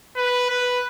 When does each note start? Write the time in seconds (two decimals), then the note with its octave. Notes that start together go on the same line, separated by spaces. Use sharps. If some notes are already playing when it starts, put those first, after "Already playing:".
0.17 B4
0.50 B4